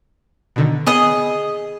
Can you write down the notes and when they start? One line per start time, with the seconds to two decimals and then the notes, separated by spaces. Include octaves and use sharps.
0.56 B2 D3 D#3
0.87 B3 G#4 D#5 D#6